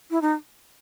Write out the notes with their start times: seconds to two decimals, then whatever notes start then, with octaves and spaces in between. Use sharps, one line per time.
0.10 E4
0.22 D#4